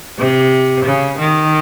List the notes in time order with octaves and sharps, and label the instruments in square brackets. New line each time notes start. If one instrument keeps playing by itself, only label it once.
[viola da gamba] C3
C#3
D#3